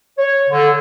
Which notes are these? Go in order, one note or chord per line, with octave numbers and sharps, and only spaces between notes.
C#5
D3